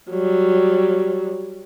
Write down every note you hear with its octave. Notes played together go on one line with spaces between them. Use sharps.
F#3 G3